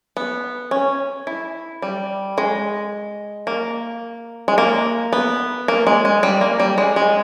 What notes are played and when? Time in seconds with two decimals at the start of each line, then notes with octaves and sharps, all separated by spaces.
0.17 B3
0.71 C#4
1.27 E4
1.82 G3
2.38 G#3
3.47 A#3
4.48 G#3
4.58 A#3
5.13 B3
5.68 A#3
5.87 G#3
6.05 G#3
6.23 G3
6.41 A#3
6.60 G3
6.78 G#3
6.96 G#3